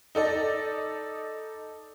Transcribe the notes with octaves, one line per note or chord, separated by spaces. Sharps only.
D#4 A4 D5 D#5